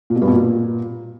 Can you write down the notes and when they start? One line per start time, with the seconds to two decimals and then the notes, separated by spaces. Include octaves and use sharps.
0.10 A#2
0.16 B2
0.22 G2
0.28 B2
0.33 A#2